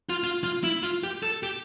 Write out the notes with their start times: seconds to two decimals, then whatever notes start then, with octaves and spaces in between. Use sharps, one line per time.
0.09 F4
0.24 F4
0.44 F4
0.63 E4
0.83 F4
1.03 G4
1.23 A4
1.43 G4